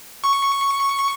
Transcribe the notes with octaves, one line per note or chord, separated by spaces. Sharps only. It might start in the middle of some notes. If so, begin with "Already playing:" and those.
C#6